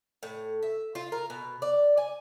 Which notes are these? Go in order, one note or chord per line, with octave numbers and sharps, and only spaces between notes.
A2
E5
F4
A#4
B2
D5
G#5